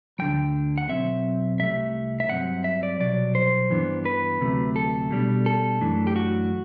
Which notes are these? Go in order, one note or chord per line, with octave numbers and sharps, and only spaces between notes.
D2 D3 F#3 G5
F#5
B1 B2 F#3 C4 E5
C2 C3 A3 E5
E5
G2 F#3 C4 F#5
E5
D5
C2 B2 F#3 D5
C5
G2 E3 B3 D4
B4
D2 C3 F#3 A3
A4
B2 G3 D4
A4
F#2 E3 A3 D4
G4
F#4